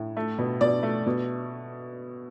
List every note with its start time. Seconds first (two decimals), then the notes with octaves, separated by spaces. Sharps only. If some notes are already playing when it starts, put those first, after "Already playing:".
Already playing: A2
0.17 A3
0.38 B2
0.61 B2 D5
0.83 A3
1.06 B2